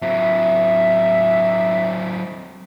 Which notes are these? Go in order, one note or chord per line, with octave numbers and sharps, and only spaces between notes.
F#3 C4 E5